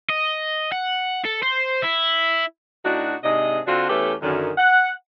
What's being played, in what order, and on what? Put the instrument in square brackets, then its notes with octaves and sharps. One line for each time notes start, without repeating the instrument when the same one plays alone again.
[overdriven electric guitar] D#5
F#5
A4
C5
E4
[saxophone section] A2 D4 D#4 F#4
G#2 C3 D4 G#4 D#5
D3 C4 D4 F4 F#4
E2 A3 C#4 G4 A4 B4
F#2 D3 D#3
F#5